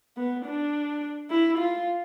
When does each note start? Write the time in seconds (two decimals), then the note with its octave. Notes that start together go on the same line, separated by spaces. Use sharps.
0.17 B3
0.46 D4
1.31 E4
1.58 F4